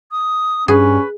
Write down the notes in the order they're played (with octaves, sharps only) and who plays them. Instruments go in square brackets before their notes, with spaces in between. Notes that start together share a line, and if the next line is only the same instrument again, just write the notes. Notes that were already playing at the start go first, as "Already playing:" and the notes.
[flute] D#6
[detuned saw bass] G2 [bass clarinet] C#4 [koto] G#4 [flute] B4